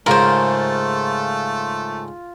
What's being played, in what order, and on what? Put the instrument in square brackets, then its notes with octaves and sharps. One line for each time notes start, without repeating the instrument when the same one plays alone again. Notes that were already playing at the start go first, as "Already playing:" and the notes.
[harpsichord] G#2 C#3 [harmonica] A3 [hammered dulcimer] F4 [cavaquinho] A#4 C5